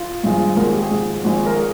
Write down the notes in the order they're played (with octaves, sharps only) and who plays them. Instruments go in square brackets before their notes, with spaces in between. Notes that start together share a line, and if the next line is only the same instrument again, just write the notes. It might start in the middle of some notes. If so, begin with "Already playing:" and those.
Already playing: [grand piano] F4
G#1 G2 F3 G#3
G#1 G#2 F3 G#3 A#4
G#4
G4
G#4
G#1 G#2 F3 G#3
G#1 G#2 F3 G#3
A#4
G#4